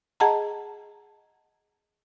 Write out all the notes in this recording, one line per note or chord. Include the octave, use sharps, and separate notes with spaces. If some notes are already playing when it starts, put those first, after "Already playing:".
G#4 D#5 F#5 A5 A#5